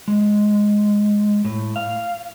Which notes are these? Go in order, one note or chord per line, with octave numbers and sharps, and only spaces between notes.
G#3
A2
F5